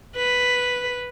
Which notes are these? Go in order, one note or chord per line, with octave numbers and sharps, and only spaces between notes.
B4